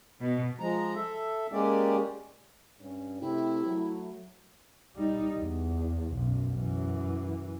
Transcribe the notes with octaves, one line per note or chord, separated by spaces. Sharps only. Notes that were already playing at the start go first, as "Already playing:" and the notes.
B2
F3 G#3 A#5
A4 E5
G#3 A#3 C#4 G4 D5
G2 C#4
C3 A3 E4 G4
F#3 A3
G3 D#4
E2
B1 F#2
F#2 E3